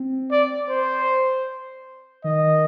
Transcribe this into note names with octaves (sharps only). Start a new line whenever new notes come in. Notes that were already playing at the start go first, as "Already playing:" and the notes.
Already playing: C4
D5
C5
D#3 D#5